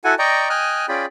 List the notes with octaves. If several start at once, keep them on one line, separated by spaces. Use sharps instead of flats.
E4 F#4 A4 F#5 G#5
D5 D#5 G5 A#5 C#6
D#5 G5 G#5 D#6 F6 F#6
C#4 F4 G#4 D5 G5 B5